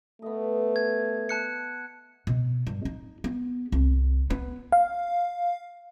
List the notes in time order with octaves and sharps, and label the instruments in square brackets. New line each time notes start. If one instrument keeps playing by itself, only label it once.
[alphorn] A3 [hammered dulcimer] B3 D#5
[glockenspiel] G#6
A5 F#6 C#7
[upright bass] B2
G2
D#4
B3
C2
B3
[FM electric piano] F5